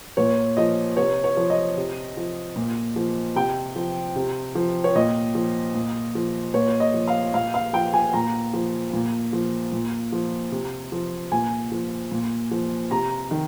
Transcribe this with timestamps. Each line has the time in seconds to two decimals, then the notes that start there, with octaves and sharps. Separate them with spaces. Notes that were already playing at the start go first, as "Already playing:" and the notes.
0.17 A#2 C#5
0.57 F3 D#5
0.97 C3 C#5
1.24 C#5
1.37 F3
1.50 D#5
1.77 C3
2.17 F3
2.56 A#2
2.96 F3
3.36 C3 G5
3.76 F3
4.16 C3
4.55 F3
4.84 C#5
4.95 A#2 D#5
5.35 F3
5.75 A#2
6.15 F3
6.54 A#2 C#5
6.80 D#5
6.94 F3
7.08 F5
7.33 A#2 F5
7.54 F5
7.73 F3 G5
7.93 G#5
8.13 A#2 A#5
8.53 F3
8.93 A#2
9.33 F3
9.72 A#2
10.12 F3
10.52 C3
10.92 F3
11.32 A#2 G#5
11.72 F3
12.11 A#2
12.51 F3
12.91 C3 A#5
13.31 D#3